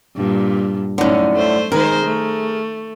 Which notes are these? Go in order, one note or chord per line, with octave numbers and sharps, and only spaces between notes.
G2 A#2
F#2 A2 D3 C#4 D#4
A3 C5
D#3 G#3 G#4 A#4 C5
A3